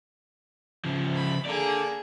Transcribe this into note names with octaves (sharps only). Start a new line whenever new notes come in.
C#3 F3
B5
A#3 G#4 A4 D5